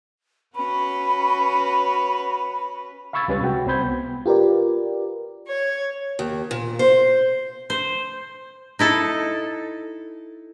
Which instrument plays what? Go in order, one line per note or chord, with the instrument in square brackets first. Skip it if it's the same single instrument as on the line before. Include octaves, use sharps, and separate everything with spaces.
[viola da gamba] C#4 F#4 B4 [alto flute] B5
[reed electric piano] F5 B5 C#6 E6 G#6 A6
C#2 G3 C#4 B4 A6
C3 G#3 F#4 G5
C2 C4 C5 B5 G6 G#6
B3
[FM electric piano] F4 G4 A#4 B4 D5
[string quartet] C#5
[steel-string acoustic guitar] D#2
A#2
C5
[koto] C5
D#4 E4 A4